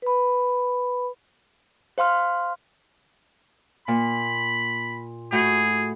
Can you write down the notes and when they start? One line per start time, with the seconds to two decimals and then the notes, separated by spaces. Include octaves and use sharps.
0.02 B4 B5
1.98 C5 F5 C6 F6
3.88 A#2 B5
5.32 A2 F#4 G#4 G6